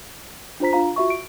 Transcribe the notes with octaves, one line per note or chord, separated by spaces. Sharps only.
D4 F4 C5 A#5 B6
D4 F4 F5 A#5
F4 F#4 E5 C#6
D7